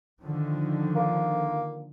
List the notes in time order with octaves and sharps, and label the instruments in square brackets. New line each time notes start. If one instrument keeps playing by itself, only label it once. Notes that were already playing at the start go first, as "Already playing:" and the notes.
[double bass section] D3 D#3 F3
[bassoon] A#3